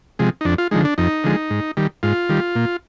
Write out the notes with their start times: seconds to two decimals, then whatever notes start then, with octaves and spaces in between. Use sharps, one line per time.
0.19 C3 F3 G#3
0.41 D#4
0.45 F2 D4
0.58 F4
0.71 D3 F3 G#3 D#4
0.85 D4
0.98 F2 D#4
1.24 D3 F3 G#3
1.50 G#2
1.77 D#3 G3
2.03 G#2 F4
2.29 D#3 G3
2.55 A#2